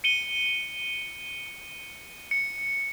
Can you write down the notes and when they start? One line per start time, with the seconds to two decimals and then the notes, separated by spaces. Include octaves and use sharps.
0.04 C#7 D#7 G7
2.31 C#7